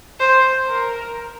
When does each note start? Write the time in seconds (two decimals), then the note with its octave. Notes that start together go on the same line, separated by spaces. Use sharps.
0.20 C5
0.69 A#4